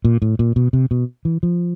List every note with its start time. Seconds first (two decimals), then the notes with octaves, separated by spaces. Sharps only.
0.05 A#2
0.22 A2
0.39 A#2
0.56 B2
0.73 C3
0.91 B2
1.25 E3
1.43 F3